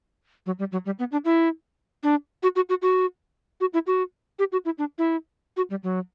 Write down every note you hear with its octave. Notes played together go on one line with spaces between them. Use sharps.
F#3
G3
F#3
G3
B3
D4
E4
D4
F#4
F#4
F#4
F#4
F#4
E4
F#4
G4
F#4
E4
D4
E4
F#4
G3
F#3